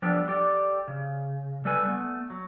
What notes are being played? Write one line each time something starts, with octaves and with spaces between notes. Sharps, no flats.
F3 G3 B3 D4 G4 A4
G4 A4 D5 G5
C#3
G3 A3 A4 B4 G#5
A3 B3
F#3